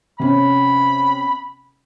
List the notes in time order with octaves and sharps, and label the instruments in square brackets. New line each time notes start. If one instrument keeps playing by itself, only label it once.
[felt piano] C3 C#4 [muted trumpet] B5